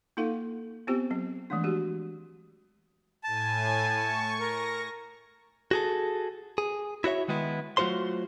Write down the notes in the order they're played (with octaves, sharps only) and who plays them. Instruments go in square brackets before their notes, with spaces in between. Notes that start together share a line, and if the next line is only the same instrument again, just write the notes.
[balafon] A#3 D#4 F4 A4 F5 F#5
B3 C4 F4 G4 C5 G5
F#3 C4
E3 F3 G#3 A3 D4
G#3 F#4 G4
[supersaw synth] A2 G#5 [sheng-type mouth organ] A5
[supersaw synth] C#6
[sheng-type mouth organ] A#4 [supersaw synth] A#6
[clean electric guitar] F#4 G#4 A4
G#4
E4 F#4 C#5 E5
D#3 G#3 B3 E4
F#3 A3 F4 F#4 C5 C6